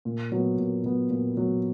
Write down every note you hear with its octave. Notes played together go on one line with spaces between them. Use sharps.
A#2
F#3 B3
A#2
F#3 B3
A#2
F#3 B3